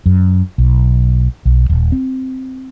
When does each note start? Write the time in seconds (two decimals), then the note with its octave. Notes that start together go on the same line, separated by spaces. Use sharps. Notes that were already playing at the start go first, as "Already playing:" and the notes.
0.06 F#2
0.58 B1
1.45 B1
1.69 D#1
1.92 C4